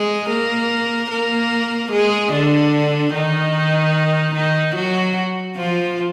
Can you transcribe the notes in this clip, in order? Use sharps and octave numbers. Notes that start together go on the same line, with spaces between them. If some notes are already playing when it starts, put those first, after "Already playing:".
Already playing: G#3 G#4
A#3 A#4
A#3 A#4
G#3 G#4
D3 D4
D#3 D#4
D#3 D#4
F#3 F#4
F3 F4